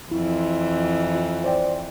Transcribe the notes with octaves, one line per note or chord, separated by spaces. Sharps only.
F2 E3 E4
F4
C5 D5 G5